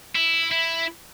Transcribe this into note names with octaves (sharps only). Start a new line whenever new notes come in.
E4
E4